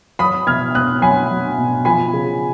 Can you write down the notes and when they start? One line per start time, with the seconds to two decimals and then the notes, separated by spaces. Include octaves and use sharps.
0.19 F#3 B5 D#6
0.47 B2 F6 G#6
0.75 B2 D#6 F#6
1.02 F#3 G#5 B5
1.30 F#3
1.58 B2
1.85 F3 G#5 B5
2.13 C#3